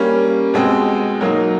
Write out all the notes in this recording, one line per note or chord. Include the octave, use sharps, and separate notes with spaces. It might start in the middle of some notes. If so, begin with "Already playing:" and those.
Already playing: G3 A#3 C#4
B2 G#3 C4
F#3 A#3 D#4